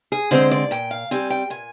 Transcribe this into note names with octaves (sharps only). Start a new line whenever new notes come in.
G#4
D3 G#3 C4 C5
D5
A#2 G5
F5
G3 C4 G#5
G5
A#2 G#5